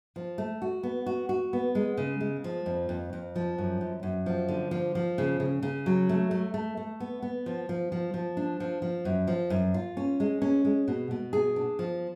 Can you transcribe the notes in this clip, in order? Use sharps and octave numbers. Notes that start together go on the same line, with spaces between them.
F3
A3
F#4
B3
F#4
F#4
B3
G#3
C#3
G#3
F3
F2
F2
F2
F3
F#2
F#2
F#2
F3
D3
F3
F3
C#3
C#3
C#3
F#3
A3
A3
A3
A3
B3
B3
F3
F3
F3
F3
D4
F3
F3
F#2
F3
F#2
F4
C#4
G#3
C#4
G#3
B2
B2
G#4
D4
F3